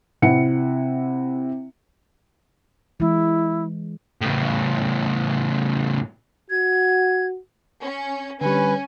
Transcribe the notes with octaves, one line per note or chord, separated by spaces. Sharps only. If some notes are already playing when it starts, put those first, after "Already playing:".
C3 E4 F#5 C#7
E3 G#3 E4
A2 C#3
F#4 G#6
C#4
D3 G3 C#4 B4 G#5